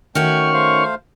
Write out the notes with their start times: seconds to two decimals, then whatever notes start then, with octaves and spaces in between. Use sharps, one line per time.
0.15 D#3 A3 C#4 F#4 G5 C#6 F6
0.53 A3 C5 F5